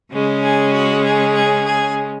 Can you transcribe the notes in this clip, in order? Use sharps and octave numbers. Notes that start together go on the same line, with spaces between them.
C#3 G#3 C#4
G#4
F#4
G#4
G#4
G#4